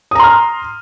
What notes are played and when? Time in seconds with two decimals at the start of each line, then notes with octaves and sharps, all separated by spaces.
0.11 D#6
0.15 A#5
0.20 C6
0.24 F6